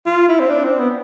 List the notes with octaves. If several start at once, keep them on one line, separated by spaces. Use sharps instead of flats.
F4
E4
C4
D4
C4
B3